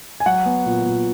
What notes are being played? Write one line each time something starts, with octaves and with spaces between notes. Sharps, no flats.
G#5
F#3 F#5
B3
A#2
A#2